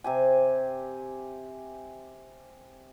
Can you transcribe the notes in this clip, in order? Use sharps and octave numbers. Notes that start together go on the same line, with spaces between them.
C3 G4 G#5